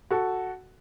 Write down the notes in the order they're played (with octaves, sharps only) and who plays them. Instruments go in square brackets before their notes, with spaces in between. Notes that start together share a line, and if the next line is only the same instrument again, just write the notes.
[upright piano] F#4 A4